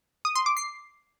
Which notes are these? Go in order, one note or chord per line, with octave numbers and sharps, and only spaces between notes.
D#6
C6
D6
C7